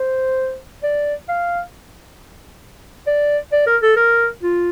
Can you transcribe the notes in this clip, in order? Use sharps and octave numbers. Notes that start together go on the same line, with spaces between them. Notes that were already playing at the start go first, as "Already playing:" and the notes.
Already playing: C5
D5
F5
D5
D5
A#4
A4
A#4
F4